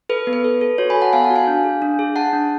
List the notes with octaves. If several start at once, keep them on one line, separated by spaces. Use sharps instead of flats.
A4 B4
B3
B4
A4
A4
F#4 C#5
G#5 B5
A4
F#5 A5
B3 F5 G#5
F#5 A5
F#4
F5 G#5
D4
G#4
D4
G#4
G#4 F#5 A5
D4